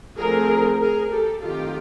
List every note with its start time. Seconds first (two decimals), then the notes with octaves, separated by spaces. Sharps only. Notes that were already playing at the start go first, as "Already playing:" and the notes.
0.18 D3 F3 A3 C4 G#4 A#4
0.81 G#4 A#4
1.11 G4 A4
1.43 D#3 F#3 A3 C4 F4 G4